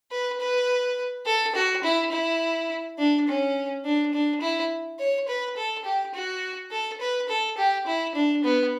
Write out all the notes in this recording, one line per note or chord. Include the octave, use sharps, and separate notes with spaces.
B4
B4
A4
F#4
E4
E4
D4
C#4
D4
D4
E4
C#5
B4
A4
G4
F#4
A4
B4
A4
G4
E4
D4
B3